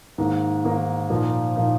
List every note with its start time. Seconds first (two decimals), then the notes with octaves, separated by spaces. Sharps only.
0.18 G#2 D#3 A#3
0.64 G#2 D#3 A#3
1.10 A#2 F3 A#3 D#4
1.56 A#2 F3 A#3 D#4